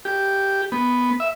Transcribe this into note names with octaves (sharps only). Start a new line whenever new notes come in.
G4
B3
E5